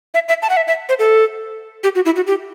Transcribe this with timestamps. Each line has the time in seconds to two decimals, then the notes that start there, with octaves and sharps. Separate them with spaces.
0.14 E5
0.28 E5
0.42 A5
0.50 F#5
0.57 E5
0.67 E5
0.89 C5
0.99 A4
1.84 G4
1.95 F#4
2.05 E4
2.16 F#4
2.27 G4